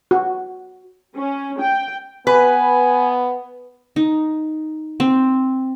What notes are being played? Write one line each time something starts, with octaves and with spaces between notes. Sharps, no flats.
F#4
C#4
G5
B3 B4 G#5
D#4
C4